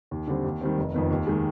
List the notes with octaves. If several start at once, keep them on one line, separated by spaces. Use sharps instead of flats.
D#2
D3 G3 C4
D#2
D#3 G3 C4
F1
F2 D#3 B3
D#2
D#3 G#3